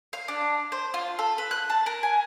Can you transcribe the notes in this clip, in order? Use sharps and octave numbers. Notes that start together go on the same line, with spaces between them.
F5
D4
C5
F4
A4
B4
F#6
A5
A#4
G#5